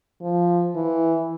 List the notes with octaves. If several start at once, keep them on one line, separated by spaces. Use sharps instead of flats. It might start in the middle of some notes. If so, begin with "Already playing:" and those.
F3
E3